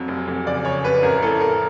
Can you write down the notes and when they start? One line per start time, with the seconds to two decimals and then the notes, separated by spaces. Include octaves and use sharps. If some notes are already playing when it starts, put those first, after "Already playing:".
Already playing: F2 F#3
0.08 F1
0.28 F1
0.46 C#3 D5
0.65 C#3 C#5
0.84 F1 B4
1.03 A1 A#4
1.22 A2 A4
1.41 A1 A#4